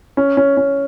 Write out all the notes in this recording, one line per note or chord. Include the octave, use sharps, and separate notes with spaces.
C#4
C#4
C#4